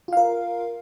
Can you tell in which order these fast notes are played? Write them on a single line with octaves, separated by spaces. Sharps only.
F4 F5 A#4